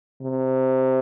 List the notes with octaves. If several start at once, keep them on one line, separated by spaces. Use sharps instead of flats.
C3